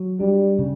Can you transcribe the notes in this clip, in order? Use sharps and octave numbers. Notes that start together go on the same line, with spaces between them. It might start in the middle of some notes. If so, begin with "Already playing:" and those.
Already playing: F#3
G3 D4
C#3